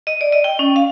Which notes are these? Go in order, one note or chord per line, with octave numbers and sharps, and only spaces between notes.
D#5
D5
D#5
G5
C#4
F5